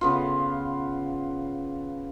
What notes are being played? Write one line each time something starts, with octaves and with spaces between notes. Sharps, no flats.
C#3 B3 F4